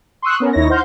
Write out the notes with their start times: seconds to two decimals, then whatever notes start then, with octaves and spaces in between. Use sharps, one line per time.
0.22 C6 C#6 D#6 E6 F#6
0.40 B3 C#4 A#4
0.53 D#2 D#4 E4 C#5 A#6
0.70 C5 F5 F#5 C6 G6